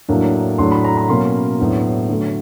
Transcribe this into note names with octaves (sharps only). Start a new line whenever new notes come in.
A2 F#3 A#3 D4
A2 F#3 A3 D4 C6
B5
A#5
B5
B2 F#3 A#3 C#4 C6
A2 F#3 B3 D4
D3 F#3 A3